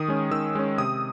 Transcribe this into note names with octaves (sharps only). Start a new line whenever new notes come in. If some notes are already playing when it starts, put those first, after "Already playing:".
Already playing: D#3 D#6
G#3 C#4
D#3 E6
G#3 C#4
C3 D#6